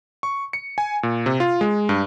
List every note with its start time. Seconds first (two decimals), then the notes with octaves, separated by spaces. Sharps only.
0.23 C#6
0.53 C#7
0.78 G#5
1.03 A#2
1.26 C3
1.40 F4
1.61 G#3
1.89 G2